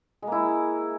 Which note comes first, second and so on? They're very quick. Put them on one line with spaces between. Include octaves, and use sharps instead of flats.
G#3 A#3 E4